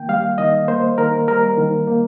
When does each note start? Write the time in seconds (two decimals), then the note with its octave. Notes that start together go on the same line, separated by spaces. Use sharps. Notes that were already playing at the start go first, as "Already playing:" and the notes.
Already playing: D#3 A#3 G5
0.09 G3 F5
0.38 D#3 D#5
0.68 A#3 C5
0.98 D#3 A#4
1.28 G3 A#4
1.57 D#3
1.87 A#3